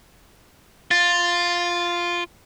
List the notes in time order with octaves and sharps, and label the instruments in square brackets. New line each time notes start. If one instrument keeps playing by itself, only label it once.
[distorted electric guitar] F4 [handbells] A6